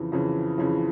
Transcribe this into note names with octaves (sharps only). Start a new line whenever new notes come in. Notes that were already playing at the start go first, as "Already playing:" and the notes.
Already playing: F2 C#3 E3
F2 C#3 E3
F2 C#3 E3